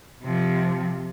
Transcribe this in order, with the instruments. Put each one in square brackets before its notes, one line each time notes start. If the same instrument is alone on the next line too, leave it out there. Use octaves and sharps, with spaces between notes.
[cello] C3 F3